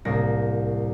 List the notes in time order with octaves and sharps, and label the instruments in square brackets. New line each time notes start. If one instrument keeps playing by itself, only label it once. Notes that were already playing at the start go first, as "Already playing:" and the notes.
[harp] C2 A2 A#3 A#6